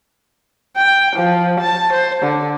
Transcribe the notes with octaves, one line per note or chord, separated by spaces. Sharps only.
G5
F3
A5
C5
D3